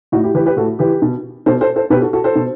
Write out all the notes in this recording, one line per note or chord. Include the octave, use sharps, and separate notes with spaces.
A2 D#4 F#4
E4 G4
E3 G4 B4
G4 B4
A2 F#4 A4
E3 G4 B4
B2
B2 A4 C5
A4 C5
A4 C5
B2 G4 B4
F#4 A4
F#4 A4
A4 C5
B2